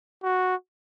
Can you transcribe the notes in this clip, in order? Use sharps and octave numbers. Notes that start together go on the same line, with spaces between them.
F#4